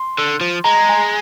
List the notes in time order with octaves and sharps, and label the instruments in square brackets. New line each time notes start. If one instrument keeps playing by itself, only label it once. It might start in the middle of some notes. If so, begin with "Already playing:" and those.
Already playing: [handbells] C6
[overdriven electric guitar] D3
F3
[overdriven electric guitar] G#3 [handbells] A#5
[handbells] G#5